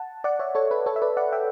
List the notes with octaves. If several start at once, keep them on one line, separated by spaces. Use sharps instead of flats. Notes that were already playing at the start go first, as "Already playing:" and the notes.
Already playing: F#5 A5
D5 F#5
C#5 E5
A4 C#5
B4
A4 C#5
E5
B4 D5
D5 F#5
E5 G5